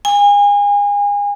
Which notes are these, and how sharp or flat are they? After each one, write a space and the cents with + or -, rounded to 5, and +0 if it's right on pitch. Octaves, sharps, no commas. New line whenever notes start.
G#5 -35